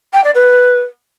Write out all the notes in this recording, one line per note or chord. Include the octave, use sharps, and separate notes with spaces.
G5
D5
B4